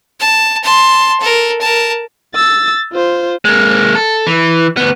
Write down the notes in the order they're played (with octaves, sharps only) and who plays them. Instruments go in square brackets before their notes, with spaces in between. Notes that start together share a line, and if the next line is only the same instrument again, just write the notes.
[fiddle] A5
A5 C6
A4 A#4
A#4 A5
[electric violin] E6 A6
F4 C5
[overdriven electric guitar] G#3 A#3
A4
E3
D2 B3